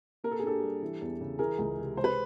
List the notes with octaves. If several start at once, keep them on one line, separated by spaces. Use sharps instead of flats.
A#3 A#4
A4
G#4
D4 G4 A4
G3
E3
E2
C#3
E3 G#4 A#4
C#2
C3
G#3 C5
B4